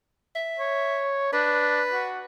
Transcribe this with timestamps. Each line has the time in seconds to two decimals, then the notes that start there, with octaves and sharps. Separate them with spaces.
0.36 E5
0.59 C#5
1.33 D4 B4
1.92 F#4